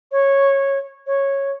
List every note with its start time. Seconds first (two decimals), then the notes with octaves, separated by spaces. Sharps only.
0.12 C#5
1.07 C#5